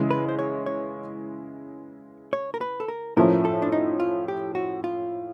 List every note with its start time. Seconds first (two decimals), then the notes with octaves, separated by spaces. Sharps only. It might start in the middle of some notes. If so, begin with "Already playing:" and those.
Already playing: C#3 E3 G#3
0.11 B4
0.29 C5
0.39 C#5
0.66 C#5
2.33 C#5
2.54 A#4
2.61 B4
2.80 A4
2.88 A#4
3.17 A2 F3 A3 C#4 A#4
3.45 A4
3.62 D4
3.72 D#4
4.00 F4
4.28 G4
4.55 F#4
4.84 F4